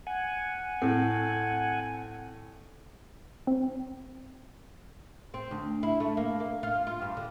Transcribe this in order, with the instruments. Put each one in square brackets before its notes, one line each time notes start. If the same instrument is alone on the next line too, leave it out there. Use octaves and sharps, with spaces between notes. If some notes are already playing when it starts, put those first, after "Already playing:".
[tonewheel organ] F#5 G#5
[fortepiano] A2 [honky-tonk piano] C4
[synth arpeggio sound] C4
[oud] C4
D2
E4
A3
A#3
A#3
F4
F4
G2
D3